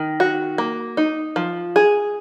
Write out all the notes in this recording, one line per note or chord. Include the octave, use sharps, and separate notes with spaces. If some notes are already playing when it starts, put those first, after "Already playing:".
Already playing: D#3
F#4
A#3
D#4
F3
G#4